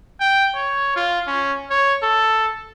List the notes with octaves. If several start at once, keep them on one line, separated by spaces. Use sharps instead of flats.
G5
C#5
F4
C#4
C#5
A4